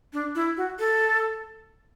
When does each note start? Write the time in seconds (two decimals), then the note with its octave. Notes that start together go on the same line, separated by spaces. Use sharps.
0.13 D4
0.35 E4
0.57 F#4
0.79 A4